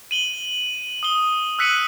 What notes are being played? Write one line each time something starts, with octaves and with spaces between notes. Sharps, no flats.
D#7 F#7 G7
D#6 G7
E6 F#6 B6 C#7 D#7 F#7